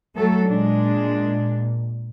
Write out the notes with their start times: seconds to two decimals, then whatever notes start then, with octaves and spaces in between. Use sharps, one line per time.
0.16 F#3 A3 A4
0.46 A#2 G#3 D4